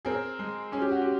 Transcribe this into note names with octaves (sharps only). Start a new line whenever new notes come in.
C4 G#4 A#4
G#3
C#4 G#4
G4
F#4
G4